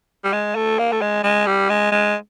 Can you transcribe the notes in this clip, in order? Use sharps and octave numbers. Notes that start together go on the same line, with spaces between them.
G3
G#3
A3
A#3
A3
G#3
G#3
G3
G#3
G#3